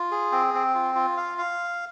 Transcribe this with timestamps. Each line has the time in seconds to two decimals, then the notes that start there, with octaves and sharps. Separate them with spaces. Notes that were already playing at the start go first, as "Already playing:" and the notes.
Already playing: F4
0.11 G#4
0.32 C4
0.54 C4
0.74 F4
0.95 F4
1.17 F5
1.38 F5